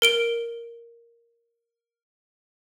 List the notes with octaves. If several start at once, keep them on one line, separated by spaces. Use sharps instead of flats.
A#4 D7 G7